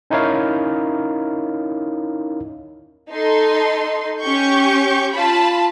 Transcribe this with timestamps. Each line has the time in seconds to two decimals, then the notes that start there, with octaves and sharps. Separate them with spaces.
0.11 C#4 D#4 E4 A#4 C#5 F5
3.11 D#4 A4 C6
4.21 C#4 G4 C#6 G6
5.13 F4 A5 B5